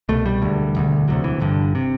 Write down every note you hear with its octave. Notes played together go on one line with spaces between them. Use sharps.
C2 B2 A3
G3
E1 D2 D3
E1 D2 D3
E1 D2 C3 F#3
E3
G1 G2 D3
C3